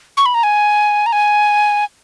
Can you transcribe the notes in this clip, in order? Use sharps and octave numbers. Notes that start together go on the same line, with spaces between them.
C#6
B5
A#5
G#5
A#5
G#5